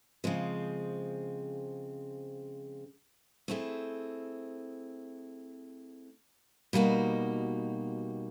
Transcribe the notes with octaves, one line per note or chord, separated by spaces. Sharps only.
C#3 F3 G#3 C4
A3 C4 E4 G#4
B2 G3 A#3 D#4 F#4